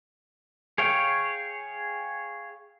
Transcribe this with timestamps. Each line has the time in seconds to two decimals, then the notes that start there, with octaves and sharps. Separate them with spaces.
0.78 G#4 C#5 F5 G5